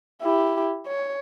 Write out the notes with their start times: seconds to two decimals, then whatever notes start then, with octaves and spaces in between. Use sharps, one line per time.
0.22 E4 G4
0.87 C#5